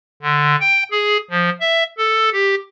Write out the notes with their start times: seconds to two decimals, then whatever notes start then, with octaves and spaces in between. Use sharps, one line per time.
0.22 D3
0.60 G5
0.91 G#4
1.30 F3
1.60 E5
1.98 A4
2.33 G4